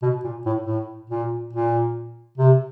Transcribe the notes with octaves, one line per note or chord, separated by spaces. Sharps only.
B2
A#2
A2
A2
A#2
A#2
C3